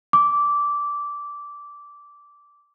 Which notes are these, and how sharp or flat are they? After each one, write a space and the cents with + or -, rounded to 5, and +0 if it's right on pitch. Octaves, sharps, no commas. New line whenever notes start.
D6 -15